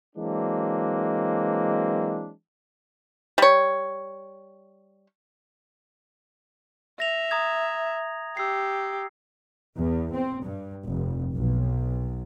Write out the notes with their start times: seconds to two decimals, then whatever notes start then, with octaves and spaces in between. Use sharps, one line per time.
0.16 E3 F#3 G#3 A#3 C4 D4
3.38 G3 C#5
7.00 E5 A#6 F7
7.31 A#5 D#6 G#6
8.37 G4 E6 C7
9.78 E2
10.14 C4
10.46 G2
10.86 F1
11.34 B1